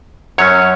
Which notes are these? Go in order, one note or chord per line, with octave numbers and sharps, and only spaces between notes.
F#2 F#3 C#4 C#5